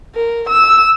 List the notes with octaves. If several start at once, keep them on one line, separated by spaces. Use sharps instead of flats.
A#4
E6